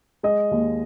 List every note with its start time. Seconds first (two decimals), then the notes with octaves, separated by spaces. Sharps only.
0.23 G#3 D#5
0.51 D#2